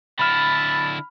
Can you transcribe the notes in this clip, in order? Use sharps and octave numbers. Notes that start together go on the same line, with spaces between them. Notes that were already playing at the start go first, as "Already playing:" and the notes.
D3 E4 A5 B5 F6